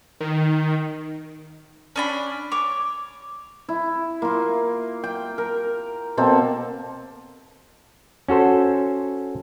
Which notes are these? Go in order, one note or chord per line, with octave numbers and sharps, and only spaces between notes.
D#3
C#4 D4 B5
C#5 D6
E4
A#3 F4
G5
A#4
B2 A#3 C4 A4
C#4 F#4 A4 C5